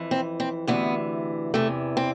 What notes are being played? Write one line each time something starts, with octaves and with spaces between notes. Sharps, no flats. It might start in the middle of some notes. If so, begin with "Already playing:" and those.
Already playing: F2 E3
C4
C4
D2 C3 E3 B3
E2 C3 E3 A3
C4